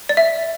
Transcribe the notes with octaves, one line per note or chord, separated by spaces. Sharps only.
D5
E5